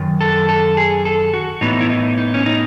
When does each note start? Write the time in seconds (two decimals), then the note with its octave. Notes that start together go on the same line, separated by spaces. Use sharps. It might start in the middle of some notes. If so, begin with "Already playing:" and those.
Already playing: F#2 D#3
0.21 A4
0.49 A4
0.77 G#4
1.05 A4
1.34 F#4
1.61 A2 E3 B3 D#4
1.81 E4
1.90 D#4
2.18 D#4
2.34 C#4
2.46 D#4